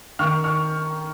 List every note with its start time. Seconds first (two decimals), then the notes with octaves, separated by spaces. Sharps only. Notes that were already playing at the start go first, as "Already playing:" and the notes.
0.19 D#3 C#6 F6
0.44 C#6 F6